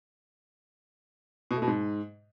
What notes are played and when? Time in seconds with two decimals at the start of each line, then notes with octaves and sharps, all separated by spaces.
1.51 B2
1.56 A3
1.62 B2
1.68 G#2